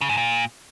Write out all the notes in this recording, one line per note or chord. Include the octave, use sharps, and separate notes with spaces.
C#3
G#2
A#2